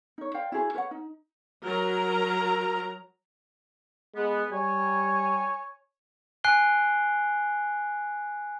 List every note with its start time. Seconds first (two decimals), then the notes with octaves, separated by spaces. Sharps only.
0.18 D#4 C#5
0.34 C5 D5 F5 G5
0.52 E4 F#4 G#4 C5
0.75 B4 C#5 D#5 F#5
0.91 D#4
1.65 F#3 A#4 A#5
4.16 G#3 B3
4.52 G3 C#5 G#5
6.44 G#5 F#6 C7 D7 G7